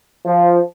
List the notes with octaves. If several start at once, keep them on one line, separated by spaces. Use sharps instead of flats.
F3